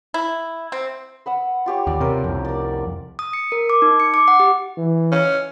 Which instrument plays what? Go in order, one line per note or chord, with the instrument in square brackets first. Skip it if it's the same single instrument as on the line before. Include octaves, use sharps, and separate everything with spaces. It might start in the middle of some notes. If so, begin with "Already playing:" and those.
[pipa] E4
C4
[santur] B4 F#5 E6
F4 G4 C#5
[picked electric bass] D#2 [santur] D5
[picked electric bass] C3 [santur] C#4 F4 A#4
[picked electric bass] C2 F2
[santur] A#4 D5
[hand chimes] D#6
C#7
A#4
D6
D#4
C#7
D6
F#5
G4
[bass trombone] E3
[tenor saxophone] C#4